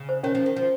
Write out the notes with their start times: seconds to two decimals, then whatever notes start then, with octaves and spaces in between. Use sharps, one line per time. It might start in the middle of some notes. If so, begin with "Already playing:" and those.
Already playing: C#3
0.09 C5
0.23 D#3 C#4 C#5
0.35 F3
0.46 D#3
0.56 F3